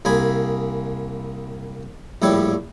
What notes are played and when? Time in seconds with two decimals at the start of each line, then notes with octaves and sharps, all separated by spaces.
0.05 C2 A#3 G#4 G#5 B5
2.22 A#1 A2 G3 E4 G4 C#5